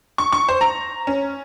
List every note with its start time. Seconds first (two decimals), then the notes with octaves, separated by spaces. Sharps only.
0.18 C#6
0.32 C#6
0.49 C5
0.61 A#5
1.07 C#4